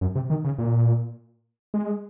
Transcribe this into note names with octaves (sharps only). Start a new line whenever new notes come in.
F#2
C3
D#3
C#3
A#2
G#3